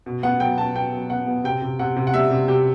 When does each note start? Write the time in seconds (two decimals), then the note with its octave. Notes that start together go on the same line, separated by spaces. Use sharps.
0.06 B2
0.23 B3 F#5
0.40 F#3 G5
0.58 B2 A5
0.75 B2 G5
0.93 F#3
1.10 B3 F#5
1.27 B3
1.44 C3 G5
1.62 C3
1.79 C3 F#5
1.96 C3
2.07 F#5
2.14 G3 E5
2.31 C3
2.48 C3 G4